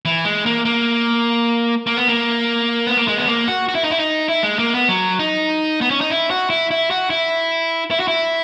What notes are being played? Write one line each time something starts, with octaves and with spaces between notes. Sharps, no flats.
E3
G#3
A#3
A#3
A#3
B3
A#3
B3
A#3
G#3
B3
A#3
F#4
F#4
E4
D#4
E4
D#4
E4
G#3
A#3
B3
F#3
D#4
B3
C#4
D#4
E4
F#4
E4
E4
F#4
E4
E4
F#4
E4